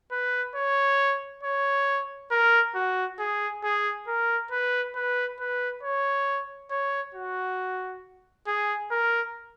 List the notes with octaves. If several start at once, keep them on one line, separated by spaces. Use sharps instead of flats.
B4
C#5
C#5
A#4
F#4
G#4
G#4
A#4
B4
B4
B4
C#5
C#5
F#4
G#4
A#4